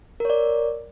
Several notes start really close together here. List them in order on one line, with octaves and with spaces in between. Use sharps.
A#4 C#5 D5